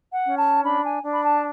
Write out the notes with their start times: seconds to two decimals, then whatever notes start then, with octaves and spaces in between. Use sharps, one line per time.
0.12 F#5
0.25 C#4
0.38 A5
0.63 D4 B5
0.83 G#5
1.03 D4
1.12 B5
1.23 A5